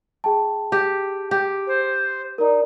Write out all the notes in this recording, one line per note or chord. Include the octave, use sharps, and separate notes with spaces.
G#4 G5 A5
G4
G4
C5
D#4 A#4 D5